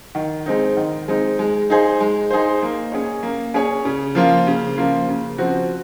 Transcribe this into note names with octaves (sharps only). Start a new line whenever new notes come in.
D#3
G#3 C4 D#4
D#3
G#3 C4 D#4
G#3
D#4 G#4 C5
G#3
D#4 G#4 C5
A#3
C#4 G#4 C#5
A#3
C#4 G#4 C#5
C#3
F3 A#3 F4
C#3
F3 A#3 F4
C#3
F3 C4 F#4